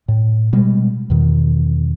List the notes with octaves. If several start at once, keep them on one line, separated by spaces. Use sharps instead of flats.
A2
B2 G3 G#3
E2 B2 D#3